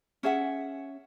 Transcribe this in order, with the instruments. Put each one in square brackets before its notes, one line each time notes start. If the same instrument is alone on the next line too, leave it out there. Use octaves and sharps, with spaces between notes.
[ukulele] C#4 G#4 E5 F#5